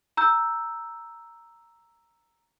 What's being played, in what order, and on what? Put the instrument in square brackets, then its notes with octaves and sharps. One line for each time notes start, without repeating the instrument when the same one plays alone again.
[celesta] A#5 E6 G6